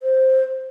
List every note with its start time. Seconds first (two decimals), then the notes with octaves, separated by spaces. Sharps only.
0.03 C5